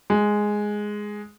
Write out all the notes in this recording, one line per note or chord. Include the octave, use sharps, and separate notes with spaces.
G#3